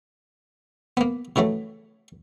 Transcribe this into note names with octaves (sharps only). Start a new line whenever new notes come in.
A#3 B3
C#3 E3 F#3 A3